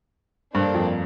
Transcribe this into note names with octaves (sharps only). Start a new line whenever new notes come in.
G2 A#3 D4 A4 C5
F2